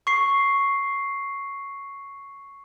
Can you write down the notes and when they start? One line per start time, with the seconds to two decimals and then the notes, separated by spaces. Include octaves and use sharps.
0.07 C#6 C7